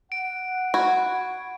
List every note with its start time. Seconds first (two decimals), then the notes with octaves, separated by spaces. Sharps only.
0.12 F#5 D7
0.74 F#4 B5 C#6 G#6